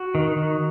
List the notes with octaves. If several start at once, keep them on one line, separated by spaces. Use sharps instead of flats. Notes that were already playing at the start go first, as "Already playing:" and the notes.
Already playing: F#4
D#3
D#3